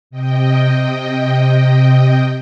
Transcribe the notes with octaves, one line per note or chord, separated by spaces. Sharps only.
C3 D#5 G5